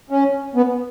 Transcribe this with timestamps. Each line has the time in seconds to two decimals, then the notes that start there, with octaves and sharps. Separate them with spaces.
0.10 C#4
0.55 B3